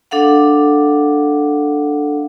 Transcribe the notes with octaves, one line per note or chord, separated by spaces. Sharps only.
D4 A4 F5 F#5